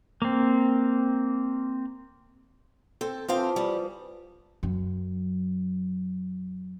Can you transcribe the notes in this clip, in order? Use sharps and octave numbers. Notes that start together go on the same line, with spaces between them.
A#3 C4
C4 A4
E3 F3 C4 C5 F5
G3
F#2 F#3